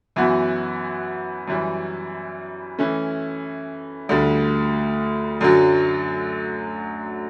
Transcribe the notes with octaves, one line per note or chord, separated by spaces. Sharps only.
F#2 E3 B3 F#4
F#2 E3 G3
E3 A3 C#4
D2 D3 G3
F#2 D3 F#3